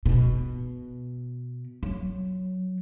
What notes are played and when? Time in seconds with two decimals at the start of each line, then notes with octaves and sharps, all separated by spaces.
0.06 B2
1.83 F#3